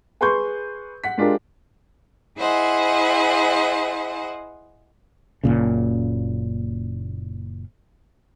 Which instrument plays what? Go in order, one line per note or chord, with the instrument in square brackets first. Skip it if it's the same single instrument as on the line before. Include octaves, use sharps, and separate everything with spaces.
[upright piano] G#4 B4 C6 C#6 G6
F#5 B6
G#3 D4 F4 G4 A#4
[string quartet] E4 G#4 C5 D#5 F#5 G#5
[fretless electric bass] F#1 B1 A#2 C#3